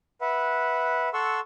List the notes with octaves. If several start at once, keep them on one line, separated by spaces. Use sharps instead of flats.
B4 E5 F#5
A4 F#5 C6 C#6 E6